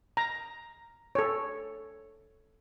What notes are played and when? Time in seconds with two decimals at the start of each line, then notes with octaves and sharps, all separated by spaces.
0.17 A#5
1.15 A4 C#5